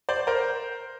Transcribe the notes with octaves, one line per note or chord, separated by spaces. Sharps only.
C5 D5
A#4 C5